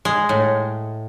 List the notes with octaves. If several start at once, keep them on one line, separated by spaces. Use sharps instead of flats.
G#3
A2